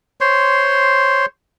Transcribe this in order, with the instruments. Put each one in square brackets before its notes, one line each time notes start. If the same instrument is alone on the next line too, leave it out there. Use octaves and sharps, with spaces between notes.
[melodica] C5 C#5 C6